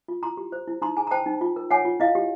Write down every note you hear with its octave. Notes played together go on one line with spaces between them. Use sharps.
F4
E4 A#5 C6
G4
C5
E4
D#4 A#5 C6
G#4 G#5 A#5
A#5
C5 G5 A5
D#4
F4
A#4
C#5 F#5 G#5
F4
E4 D#5 F5
G4